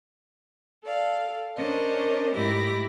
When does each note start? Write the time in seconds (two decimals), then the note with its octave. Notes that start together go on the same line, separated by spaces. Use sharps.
0.83 A4 D5 F5
1.57 C#4 D4 A#4 C5 D#5
2.34 G#2 A3 E4 G4 D6 A#6